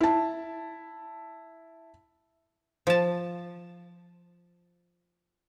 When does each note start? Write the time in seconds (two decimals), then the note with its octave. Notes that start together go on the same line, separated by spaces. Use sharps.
0.01 E4 A5
2.87 F3 A5